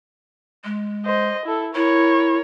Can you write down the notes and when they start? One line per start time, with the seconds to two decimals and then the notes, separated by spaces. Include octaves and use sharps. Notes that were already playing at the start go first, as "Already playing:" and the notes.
0.64 G#3
1.05 C5 D#5
1.46 E4 A4
1.75 E4 A#4 C#5